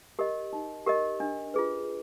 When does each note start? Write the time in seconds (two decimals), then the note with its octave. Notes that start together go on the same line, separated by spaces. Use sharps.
0.19 G4 A#4 D#5
0.53 D#4
0.86 G4 A#4 D#5
1.20 D4
1.54 F4 G#4 B4